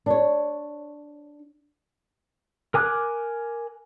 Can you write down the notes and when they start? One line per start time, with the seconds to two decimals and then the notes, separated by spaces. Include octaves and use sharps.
0.06 D4 C#5
2.74 A#4 G#5 D6 F#6